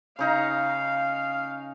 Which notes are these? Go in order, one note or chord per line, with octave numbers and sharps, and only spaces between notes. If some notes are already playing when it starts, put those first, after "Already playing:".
C#3 D#4 F5 A#5